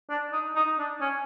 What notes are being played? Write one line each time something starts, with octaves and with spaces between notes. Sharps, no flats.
D4
D#4
D#4
D4
C#4